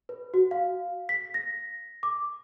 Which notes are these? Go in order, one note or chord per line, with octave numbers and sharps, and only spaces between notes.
B4
F#4
F5
B6
A#6
D6